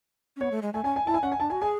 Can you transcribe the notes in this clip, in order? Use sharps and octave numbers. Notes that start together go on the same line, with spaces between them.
C#4
B3 C#5
A3
G#3
A3 G#5
C#4 G#5
G#5
E4 A5
G#5
C#4 F#5
G#5
D4 A5
F#4 G#5
G#4 G#5